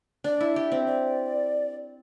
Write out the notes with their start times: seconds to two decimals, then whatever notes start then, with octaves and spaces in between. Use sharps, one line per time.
0.24 D4 D5
0.41 E4
0.56 G4
0.72 C4
0.87 D5